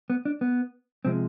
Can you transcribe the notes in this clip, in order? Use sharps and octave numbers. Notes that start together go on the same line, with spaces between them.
B3
D4
B3
C3 F3 G#3 C4